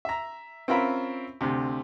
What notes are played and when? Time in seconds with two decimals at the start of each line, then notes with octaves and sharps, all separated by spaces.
0.05 E5 A#5
0.68 C4 C#4 F4 A#4 E5 B5
1.41 D2 C3